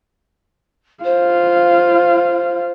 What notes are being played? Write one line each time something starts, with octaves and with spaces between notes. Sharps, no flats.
F4 C5 F5